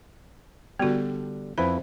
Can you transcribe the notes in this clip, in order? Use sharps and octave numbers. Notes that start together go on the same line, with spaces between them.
D3 G3 B3 F#4
F2 E4 B4 C5